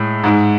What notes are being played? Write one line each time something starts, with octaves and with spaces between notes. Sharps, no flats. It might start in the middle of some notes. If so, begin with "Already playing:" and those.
Already playing: A2 G#3
G#2 G#3